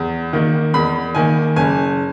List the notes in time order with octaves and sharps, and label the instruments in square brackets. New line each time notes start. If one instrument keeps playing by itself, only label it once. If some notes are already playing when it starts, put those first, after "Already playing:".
Already playing: [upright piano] E2
D#3 A#3
E2 B5
D#3 A#3 G#5
F#1 G#5